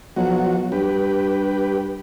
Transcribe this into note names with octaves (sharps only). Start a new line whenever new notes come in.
B1 F3 F#3 F#4
G2 G4 B4